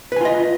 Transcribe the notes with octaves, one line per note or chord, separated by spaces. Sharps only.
F4 B4 D#5 G#5